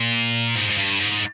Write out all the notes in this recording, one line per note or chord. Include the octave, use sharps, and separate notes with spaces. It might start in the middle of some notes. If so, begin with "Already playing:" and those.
Already playing: A#2
G#2
G#2
G2
G#2